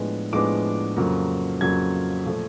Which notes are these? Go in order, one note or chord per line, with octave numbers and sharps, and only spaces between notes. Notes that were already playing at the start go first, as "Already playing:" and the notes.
Already playing: A2 F3 G#3 B3 D4
A2 F3 G#3 B3 D4 D6
F2 C#3 F#3 A#3
F2 C#3 F#3 A#3 G#6
A#2 F3 A3